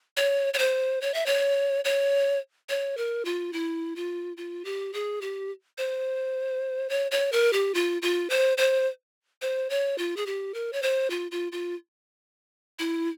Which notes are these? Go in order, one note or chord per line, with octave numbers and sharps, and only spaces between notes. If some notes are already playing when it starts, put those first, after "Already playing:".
C#5
C#5
C5
C#5
E5
C#5
C#5
C#5
A#4
F4
E4
F4
F4
G4
G#4
G4
C5
C#5
C#5
A#4
G4
F4
F4
C5
C5
C5
C#5
F4
G#4
G4
A#4
C#5
C5
F4
F4
F4
E4